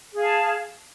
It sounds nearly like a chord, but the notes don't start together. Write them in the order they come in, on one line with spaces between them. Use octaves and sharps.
G#4 F5 A5